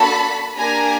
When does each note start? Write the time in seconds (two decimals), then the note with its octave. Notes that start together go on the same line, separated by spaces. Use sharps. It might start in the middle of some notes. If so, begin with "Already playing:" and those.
Already playing: A#3 D4 F#4 A4 A5 B5
0.57 A#3 D4 G4 G#5 A#5